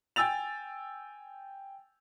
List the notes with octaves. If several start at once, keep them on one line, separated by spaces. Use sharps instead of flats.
G5 G#5 E6 A6 F7